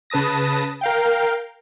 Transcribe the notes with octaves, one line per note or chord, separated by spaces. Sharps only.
C#3 B4 A5 D#6 A#6
A#4 F5 G5